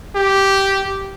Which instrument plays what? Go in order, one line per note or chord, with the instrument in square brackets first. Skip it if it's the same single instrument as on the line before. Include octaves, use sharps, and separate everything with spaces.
[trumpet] G4